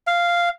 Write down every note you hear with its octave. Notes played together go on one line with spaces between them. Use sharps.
F5